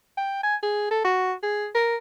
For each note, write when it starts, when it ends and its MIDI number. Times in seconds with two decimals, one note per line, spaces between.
0.18 0.39 79
0.43 0.55 80
0.63 0.89 68
0.91 1.04 69
1.05 1.34 66
1.43 1.68 68
1.75 1.96 70